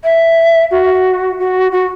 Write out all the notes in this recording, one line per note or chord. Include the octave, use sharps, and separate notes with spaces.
E5
F#4
F#4
F#4